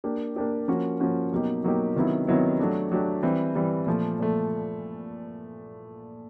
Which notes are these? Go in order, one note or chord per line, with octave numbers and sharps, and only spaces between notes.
A#3 D4 G4
A#3 D4 G4
F3 A#3 C#4 F#4
F3 A#3 C#4 F#4
B2 F#3 A#3 D#4 G4
B2 F#3 A#3 D#4 G4
C3 D#3 F#3 B3 E4
C3 D#3 F#3 B3 E4
F#3 A3 D4 G4
F#3 A3 D4 G4
E3 G3 C4
E3 G3 C4
A#2 F3 A3
A#2 F3 A3